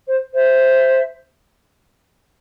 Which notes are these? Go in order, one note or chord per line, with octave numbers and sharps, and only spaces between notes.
C5
C5 E5